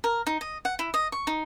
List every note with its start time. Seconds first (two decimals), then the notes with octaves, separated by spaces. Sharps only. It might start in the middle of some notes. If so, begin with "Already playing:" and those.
0.04 A#4
0.27 D#4
0.41 D#5
0.65 F#5
0.79 E4
0.94 D#5
1.12 C#6
1.27 D#4